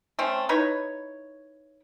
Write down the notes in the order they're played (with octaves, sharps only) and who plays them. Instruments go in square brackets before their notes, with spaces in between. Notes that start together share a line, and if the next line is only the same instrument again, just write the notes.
[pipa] A3 C4 C#4
D#4 E4 B4 C#5